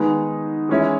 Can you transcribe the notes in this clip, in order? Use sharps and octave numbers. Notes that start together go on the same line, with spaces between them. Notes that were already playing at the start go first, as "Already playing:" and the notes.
Already playing: D#3 G#3 B3 D#4
E3 G#3 C#4 E4